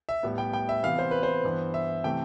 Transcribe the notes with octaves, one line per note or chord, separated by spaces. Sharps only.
E5
A2 G3 B3
G5
G5
E5
C3 E3 B3 F5
C5
B4
C5
G2 E3 B3
E5
C3 E3 A3 G5